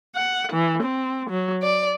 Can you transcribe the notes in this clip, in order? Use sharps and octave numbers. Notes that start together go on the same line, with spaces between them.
F#5
E3
C4
F#3
D5